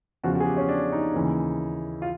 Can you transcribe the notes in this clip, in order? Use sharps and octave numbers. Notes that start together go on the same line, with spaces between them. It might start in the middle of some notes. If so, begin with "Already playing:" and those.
E2 C#3 F3 F#4
F#4
G#4
G4
C#4
D4
D#4
D#2 C#3 E3
F4